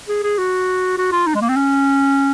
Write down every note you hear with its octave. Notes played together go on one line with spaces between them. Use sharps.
G#4
G#4
F#4
F#4
F4
D#4
G#3
A#3
C4
C#4